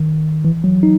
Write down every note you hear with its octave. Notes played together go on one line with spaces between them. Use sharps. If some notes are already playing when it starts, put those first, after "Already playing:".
Already playing: D#3
E3
F#3
D#4